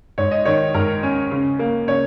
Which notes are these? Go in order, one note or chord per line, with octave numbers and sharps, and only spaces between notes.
G#2 C#5
D#5
D#3 C#5
G#2 A#4
C#4
C#3
A#3
C#3 C#5